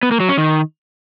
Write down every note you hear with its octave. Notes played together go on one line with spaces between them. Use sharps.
B3
A#3
F#3
C#4
D#3